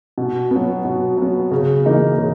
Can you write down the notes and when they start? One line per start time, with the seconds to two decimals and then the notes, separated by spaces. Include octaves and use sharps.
0.18 B2
0.51 F#3 B3
0.85 B2
1.17 F#3 B3
1.51 C#3
1.85 E3 A#3 D#4
2.18 C#3